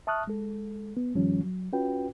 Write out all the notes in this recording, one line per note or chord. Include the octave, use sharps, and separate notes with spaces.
E5 A5 C#6 D#6 F6 F#6
G#3 A4
B3
G2 D#3 F3 G3 C#4
F#3
C#4 F4 F#4 B4 G5